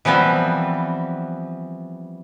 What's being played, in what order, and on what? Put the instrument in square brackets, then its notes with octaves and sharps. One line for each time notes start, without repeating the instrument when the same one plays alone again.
[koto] E3 F3 G3 B3 C4